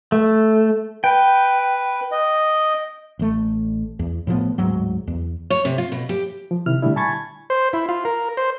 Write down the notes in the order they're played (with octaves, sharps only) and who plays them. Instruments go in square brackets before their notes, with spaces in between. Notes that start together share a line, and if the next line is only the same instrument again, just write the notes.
[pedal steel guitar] A3
[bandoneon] B4 [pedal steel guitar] G5
[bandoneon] D#5
[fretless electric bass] A1 A3
E2
A2 F3 G#3 B3
D1 G#2 F#3
E2
[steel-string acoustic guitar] C#5
C3
F4
B2
G4
[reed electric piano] F3
C3 D#3 E4 F6
A#2 D3 G3 A3 D4 E4
G#5 A5 B5 C#6 G#6 A6
[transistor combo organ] C5
E4
F4
A#4
C5